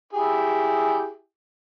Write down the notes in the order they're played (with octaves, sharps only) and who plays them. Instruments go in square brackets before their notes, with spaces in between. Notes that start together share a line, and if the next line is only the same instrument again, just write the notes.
[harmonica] E4 G4 G#4